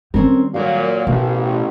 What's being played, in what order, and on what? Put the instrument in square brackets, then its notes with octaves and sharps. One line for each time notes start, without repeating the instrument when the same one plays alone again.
[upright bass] D#3 G3 [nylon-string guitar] C4 C#4 A#4
[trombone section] A#2 F#3 [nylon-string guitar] A#4 F5
[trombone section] A1 [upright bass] B2